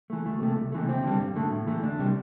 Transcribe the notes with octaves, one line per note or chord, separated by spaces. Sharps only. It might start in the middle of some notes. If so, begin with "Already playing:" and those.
E3 A3
D2 A3
C3 A3
C2
C3 E3 A3
D2 C4
D3 G3
G2
D3 A3
A2
E3 A3
D2 D4
C3 G3